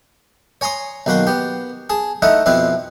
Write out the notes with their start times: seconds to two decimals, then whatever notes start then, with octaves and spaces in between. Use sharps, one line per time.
0.61 C#5 G#5 A#5 C6 D#6
1.06 B1 D#3 A#3 F#4 B5 C6
1.27 B3 G4
1.90 G#4 A5
2.22 A3 D#4 E4 D#5 F#5
2.46 F2 B2 C4 E4 B4